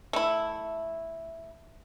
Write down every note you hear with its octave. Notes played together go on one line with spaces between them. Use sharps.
A3 E4